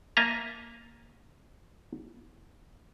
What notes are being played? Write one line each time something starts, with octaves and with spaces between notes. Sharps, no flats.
A#3 D#5 E5 A5 A#5